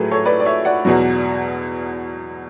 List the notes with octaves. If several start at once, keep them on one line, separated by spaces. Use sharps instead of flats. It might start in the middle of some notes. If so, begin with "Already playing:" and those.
Already playing: A2 F#3 A3 G#4 B4
A4 C#5
B4 D5
D5
C#5 E5
D5 F#5
E2 B2 F#3